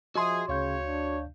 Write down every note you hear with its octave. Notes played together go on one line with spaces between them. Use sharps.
F3 F#4 G#4 D#5 E5 C6
D2 C#3 C#5 F5 G6
D4